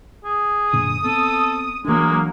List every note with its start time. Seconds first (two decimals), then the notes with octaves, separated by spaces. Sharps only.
0.25 G#4
0.73 F#2 A#2 D3 D#6
1.04 B3 C4 A4
1.85 E3 F#3 G#3 A#3 D4